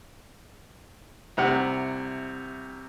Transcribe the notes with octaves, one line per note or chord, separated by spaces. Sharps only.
C2 C3 F#5